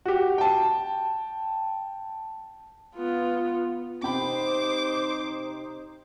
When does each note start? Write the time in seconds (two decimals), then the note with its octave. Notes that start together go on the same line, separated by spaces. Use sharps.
0.06 F#4 G4
0.38 G5 A5
2.95 B3 F4
4.03 C3 D#4 C5 G5 B5 D6